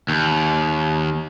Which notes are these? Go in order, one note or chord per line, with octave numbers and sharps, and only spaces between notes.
D#2